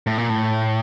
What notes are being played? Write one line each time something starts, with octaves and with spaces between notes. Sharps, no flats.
A2
A#2
A2